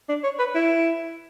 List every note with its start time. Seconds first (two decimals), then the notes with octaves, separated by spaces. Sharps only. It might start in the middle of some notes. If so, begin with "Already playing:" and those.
0.09 D4
0.23 C#5
0.39 B4
0.55 E4